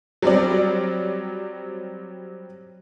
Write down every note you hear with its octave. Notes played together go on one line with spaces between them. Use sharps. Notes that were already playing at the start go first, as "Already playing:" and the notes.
F#3 G3 C4 D5